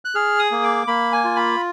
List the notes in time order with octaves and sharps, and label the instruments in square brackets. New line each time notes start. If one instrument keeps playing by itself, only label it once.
[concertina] F#6
G#4 F6
D#6
A#3
D6
A#3 B5
G#5
F4
B5